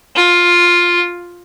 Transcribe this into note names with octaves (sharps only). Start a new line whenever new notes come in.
F4